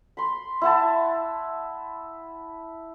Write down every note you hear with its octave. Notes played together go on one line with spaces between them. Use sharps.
B5 C6
E4 F#5 A5